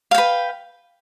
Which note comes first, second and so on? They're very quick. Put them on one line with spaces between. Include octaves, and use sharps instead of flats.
F5 G5 B4